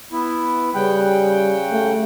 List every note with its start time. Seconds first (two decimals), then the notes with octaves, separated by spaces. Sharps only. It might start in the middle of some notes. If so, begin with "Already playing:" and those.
0.12 B3 E4
0.75 C#3 G3 F#5 G5
1.72 A3